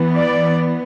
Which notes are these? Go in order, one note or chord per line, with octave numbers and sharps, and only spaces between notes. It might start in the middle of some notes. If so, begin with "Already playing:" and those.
Already playing: E3 B3
D5